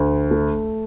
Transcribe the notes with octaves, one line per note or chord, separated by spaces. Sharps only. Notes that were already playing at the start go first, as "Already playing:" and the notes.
Already playing: D2
A3